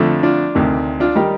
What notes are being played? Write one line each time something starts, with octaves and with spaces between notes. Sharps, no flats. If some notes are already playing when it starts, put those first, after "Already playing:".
Already playing: F2 D3 F3 A3
D4 F4
D2 C3 D#3
D4 F4
D#3 G3 D#4 G4